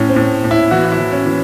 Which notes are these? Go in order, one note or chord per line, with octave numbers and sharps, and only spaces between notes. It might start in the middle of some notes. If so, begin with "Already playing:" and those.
Already playing: A2 C#4
C4
A2
A2
E4
E3 F#4
F#4
E4
E3
C#4
E3